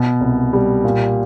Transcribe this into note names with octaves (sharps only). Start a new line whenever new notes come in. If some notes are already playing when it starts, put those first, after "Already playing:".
Already playing: B2
C2
G3
A#2